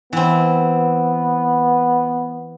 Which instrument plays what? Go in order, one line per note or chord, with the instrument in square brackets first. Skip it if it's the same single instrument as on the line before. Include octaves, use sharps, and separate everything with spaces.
[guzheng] E3 C4 [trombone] B3